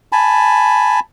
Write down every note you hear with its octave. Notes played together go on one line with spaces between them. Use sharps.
G#5 A5 B5